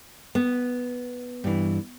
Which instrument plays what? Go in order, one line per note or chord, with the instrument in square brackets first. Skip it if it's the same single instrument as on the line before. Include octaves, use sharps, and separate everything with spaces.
[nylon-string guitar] B3
[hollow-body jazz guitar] G2 E3